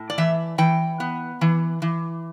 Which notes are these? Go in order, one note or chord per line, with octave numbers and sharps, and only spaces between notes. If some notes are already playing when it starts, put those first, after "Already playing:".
Already playing: A2
D5
E3 E5
E3 G5
B3
E3
E3